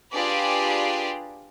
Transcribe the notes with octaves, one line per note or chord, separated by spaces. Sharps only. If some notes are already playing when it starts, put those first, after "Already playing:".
D4 F4 G4 G#4 B4 D5